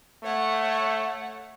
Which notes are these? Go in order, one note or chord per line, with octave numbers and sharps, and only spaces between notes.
A3 C#5 F#5